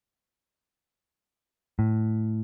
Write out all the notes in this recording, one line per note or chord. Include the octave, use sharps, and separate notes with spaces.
A2